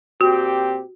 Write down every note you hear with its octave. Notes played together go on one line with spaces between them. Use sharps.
A#2 C4 F#4 G4